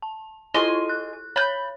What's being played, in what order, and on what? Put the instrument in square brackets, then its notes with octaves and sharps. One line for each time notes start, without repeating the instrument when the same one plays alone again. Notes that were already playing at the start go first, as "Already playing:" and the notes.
[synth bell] A5
[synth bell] E4 F4 A4 [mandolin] D#5 G#5 C6
[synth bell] F#6
[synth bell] C#5 [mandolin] B5 G6